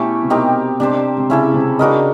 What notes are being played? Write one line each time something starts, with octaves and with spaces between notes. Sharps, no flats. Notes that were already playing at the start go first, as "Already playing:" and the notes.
Already playing: B2 A3 C#4 E4 G4
C3
B2 C4 D#4 G4 A#4
C3 D4 G4 C5
C3
C#3 C#4 E4 A4
C3
C#3 D4 F#4 A#4 D#5